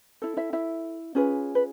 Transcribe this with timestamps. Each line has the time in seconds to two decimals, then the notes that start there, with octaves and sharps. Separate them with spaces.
0.22 E4 A4
0.37 E4 E5
0.53 E4 E5
1.15 C#4 F4 G#4 B4
1.55 B4